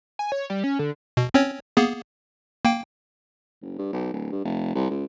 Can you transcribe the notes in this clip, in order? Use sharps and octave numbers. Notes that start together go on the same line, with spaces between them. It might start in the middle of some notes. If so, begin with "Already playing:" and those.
G#5
C#5
G3
C#4
D3
B2
C4 C#4 C#5
A#3 B3 G#4
A#3 G5
F#1
G2
B1
D1
G2
F1
C2
C#2